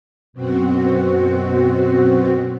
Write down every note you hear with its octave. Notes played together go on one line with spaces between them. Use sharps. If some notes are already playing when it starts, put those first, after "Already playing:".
F#2 B2 C4 F#4